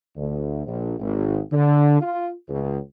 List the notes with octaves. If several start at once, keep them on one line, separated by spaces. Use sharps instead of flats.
D2
A#1
G#1
D3
F4
C#2